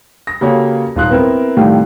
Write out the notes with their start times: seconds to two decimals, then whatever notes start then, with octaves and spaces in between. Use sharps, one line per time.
0.27 A#6
0.41 C#3 A#3 F#4 G4 A4 C#5
0.95 D#1 G#2 F4 C6 F#6
1.10 B3 C4 E4 A#4
1.57 A2 C3 D#3 G3 A3 F4